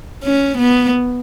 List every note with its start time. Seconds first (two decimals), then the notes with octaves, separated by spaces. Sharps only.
0.24 C#4
0.58 B3